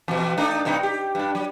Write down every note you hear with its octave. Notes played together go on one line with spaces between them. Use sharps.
E2 B2
A3 D4 D#4
G2 B2 D#4
G4
G2 D4
F#3